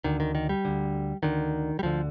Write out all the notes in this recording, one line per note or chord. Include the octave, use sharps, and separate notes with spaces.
D2 D3 D#3
D#3
D#3
G3
D2 D3
D2 D3 D#3
G3
D2 D3 F3